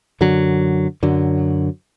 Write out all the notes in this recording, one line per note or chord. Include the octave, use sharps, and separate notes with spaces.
F#2 D3 F#3
F#2 D3 F#3